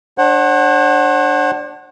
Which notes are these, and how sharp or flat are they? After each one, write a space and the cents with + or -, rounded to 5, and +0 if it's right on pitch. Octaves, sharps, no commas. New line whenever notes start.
D4 +0 C5 +45 F#5 +10